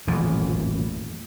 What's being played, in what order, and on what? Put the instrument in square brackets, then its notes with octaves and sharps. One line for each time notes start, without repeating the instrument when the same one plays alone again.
[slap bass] D#1 A1 F2 E3